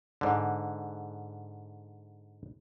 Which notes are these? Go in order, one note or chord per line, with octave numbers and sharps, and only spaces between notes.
G#2 D3